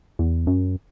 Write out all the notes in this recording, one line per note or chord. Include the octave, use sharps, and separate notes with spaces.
E2
F#2